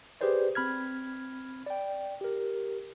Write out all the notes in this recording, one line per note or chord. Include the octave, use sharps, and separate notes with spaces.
G4 G#4 B4 C5 D5
C4 B5 F6 G#6
D5 G5
G4 A#4